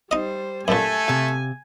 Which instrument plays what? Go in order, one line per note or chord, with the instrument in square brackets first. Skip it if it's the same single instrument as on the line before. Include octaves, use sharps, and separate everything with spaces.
[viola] G3 C5 [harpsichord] D#4 D#5
[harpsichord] F#2 A#2 [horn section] A3 A4 [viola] G#5
[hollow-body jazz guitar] C3 F5